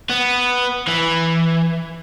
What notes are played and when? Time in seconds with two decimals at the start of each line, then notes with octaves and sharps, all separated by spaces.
0.10 B3
0.87 E3